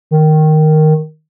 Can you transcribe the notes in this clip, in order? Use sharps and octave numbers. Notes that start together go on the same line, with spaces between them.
D#3